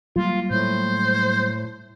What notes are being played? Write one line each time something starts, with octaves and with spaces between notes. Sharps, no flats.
F#3 G3 A#3 F4
A2 C5